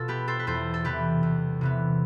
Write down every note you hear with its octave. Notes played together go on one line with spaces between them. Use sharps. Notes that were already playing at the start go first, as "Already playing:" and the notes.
Already playing: B2 F4 A4
B3 G4 B4
A4 C5
B4
E2 A4 C5
A4
C3 E3 B3 G4 B4
E2
C3 E3 B3